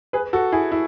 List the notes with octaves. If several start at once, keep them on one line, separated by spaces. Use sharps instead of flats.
G#4 B4
F#4 A4
E4 G#4
E4